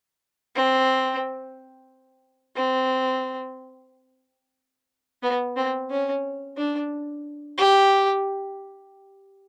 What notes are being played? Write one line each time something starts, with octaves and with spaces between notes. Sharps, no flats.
C4
C4
B3
C4
C#4
D4
G4